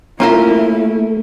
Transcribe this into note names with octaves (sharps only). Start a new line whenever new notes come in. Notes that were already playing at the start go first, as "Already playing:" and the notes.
A3 A#3 C#4 E4 F4 A#4 E5